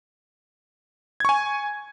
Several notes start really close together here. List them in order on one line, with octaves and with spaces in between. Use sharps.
G#6 C#6 G#5